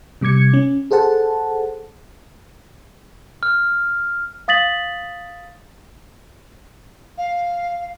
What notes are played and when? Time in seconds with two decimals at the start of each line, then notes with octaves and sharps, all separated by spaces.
0.21 C3 G3 D6 G#6 C#7
0.53 C#4
0.91 G#4 A4 C5 F#5 A5
3.43 F6
4.48 F5 D#6 A6 B6 F#7
7.18 F5